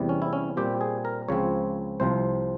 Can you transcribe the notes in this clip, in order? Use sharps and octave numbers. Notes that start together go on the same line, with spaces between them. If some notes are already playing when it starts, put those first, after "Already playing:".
Already playing: E2 C3 G3
C#4
E4
C#4
A#2 G3 C4 G4
G#4
A#4
C#2 C#3 F3 C4 C#5
C2 C3 F3 C5